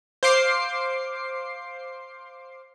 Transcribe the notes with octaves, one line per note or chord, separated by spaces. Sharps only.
C5 F5 C6 D6 C7